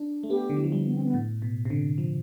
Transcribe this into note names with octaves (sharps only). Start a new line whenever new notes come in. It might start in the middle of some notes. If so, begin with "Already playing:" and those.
Already playing: D4
A3
B3 G4
D3
E3
F3
G3
B3
C4
B3
A2
B2
C3
D3
F3